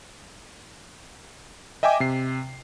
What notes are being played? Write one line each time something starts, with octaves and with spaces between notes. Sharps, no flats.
D#5 E5 G5 G#5 D6
C3 C7